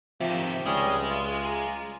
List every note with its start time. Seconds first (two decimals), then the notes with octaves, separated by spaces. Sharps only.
0.21 C3 D#3 F3 G4 E5
0.66 C#2 G3 G#3 C#4 D#6
1.10 F4
1.45 G#5 A#5 D6